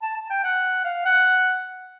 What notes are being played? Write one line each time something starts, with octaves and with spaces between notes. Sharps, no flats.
A5
A5
G5
F#5
F5
F#5